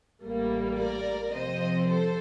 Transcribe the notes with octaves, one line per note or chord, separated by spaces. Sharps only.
A1 A2 G3 A#3
A#4 D5
F2 C3 F3 C4 C5 D#5
A4 C5